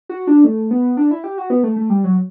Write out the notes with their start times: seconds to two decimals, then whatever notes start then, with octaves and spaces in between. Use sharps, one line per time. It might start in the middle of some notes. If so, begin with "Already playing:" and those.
0.09 F#4
0.27 D4
0.44 A3
0.71 B3
0.97 D4
1.11 E4
1.24 G4
1.38 F#4
1.50 B3
1.64 A3
1.76 A3
1.90 G3
2.04 F#3